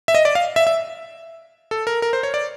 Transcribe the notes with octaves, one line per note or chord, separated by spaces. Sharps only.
E5
D#5
D5
F5
E5
E5
A4
A#4
A#4
C5
C#5
D5